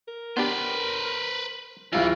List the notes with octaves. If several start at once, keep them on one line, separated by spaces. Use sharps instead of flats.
A#4
B3 D4 G4 B4 C5
D1 E3 E4 F4 F5